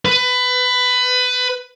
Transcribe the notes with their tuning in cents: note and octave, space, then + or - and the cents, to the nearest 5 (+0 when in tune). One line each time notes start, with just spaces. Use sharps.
B4 +20